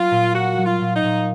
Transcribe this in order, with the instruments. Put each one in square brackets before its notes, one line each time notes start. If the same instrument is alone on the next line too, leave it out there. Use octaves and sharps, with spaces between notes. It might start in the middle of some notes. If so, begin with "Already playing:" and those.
Already playing: [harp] F#3 A#3 [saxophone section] F4
[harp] A#2
[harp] A#3 [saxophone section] F#4
[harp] F#3
[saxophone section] F4
[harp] A#2
[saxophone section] D#4
[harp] A#2